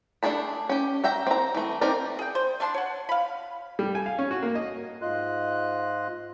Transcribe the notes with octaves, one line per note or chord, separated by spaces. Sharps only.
A3 D4 G#4 A5 B5
C#4 G4
F#4 E5 G5 A#5
C4 A#5
E3 A3
C4 D#4 G4 A#4 D5
G#4 G5
C5
A3 D4 A5 C6
C#5 F#5
F5 B5
G3
G#5
F5
C#4
F#4
A#3
D#5
G#2 F4 D#5 C6 F#6